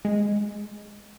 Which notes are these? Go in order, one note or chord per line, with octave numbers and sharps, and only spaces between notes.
G#3